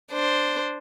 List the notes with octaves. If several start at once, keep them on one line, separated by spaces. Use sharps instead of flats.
D4 C5